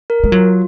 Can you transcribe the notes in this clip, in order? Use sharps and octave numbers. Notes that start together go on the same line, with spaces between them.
A#4
G#3
F#3 F4